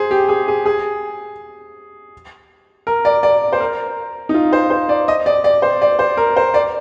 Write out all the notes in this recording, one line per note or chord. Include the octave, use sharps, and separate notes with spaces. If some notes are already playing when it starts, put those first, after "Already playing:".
Already playing: G#4 C5
G4
G#4
G#4
G#4
A#4
D5
D5
C5
A#4
D#4
F4
C5
C5
D5
D#5
D5
D5
C5
D5
C5
A#4
C5
D5